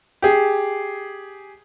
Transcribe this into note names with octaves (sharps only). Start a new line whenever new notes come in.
G4 G#4